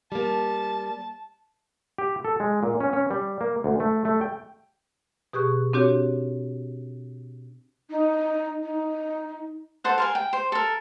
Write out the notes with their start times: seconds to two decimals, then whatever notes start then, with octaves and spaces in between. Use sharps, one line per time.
0.12 G3 A#3 A5
1.98 G4
2.25 A4
2.40 G#3
2.63 A#2
2.80 C#4
2.93 C#4
3.11 G3
3.41 A#3
3.64 D2
3.80 A3
4.05 A3
4.21 G5
5.33 B2 G4 G#4 C#6 F#6
5.73 C4 D4 F#4 G4 C#5
7.90 D#4
8.63 D#4
9.84 A4 C5 F#5
9.98 A#4 F5 G#5
10.15 G5
10.33 C5
10.52 A4 A#4